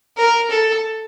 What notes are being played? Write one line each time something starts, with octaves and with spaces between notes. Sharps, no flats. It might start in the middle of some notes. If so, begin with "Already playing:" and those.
A#4
A4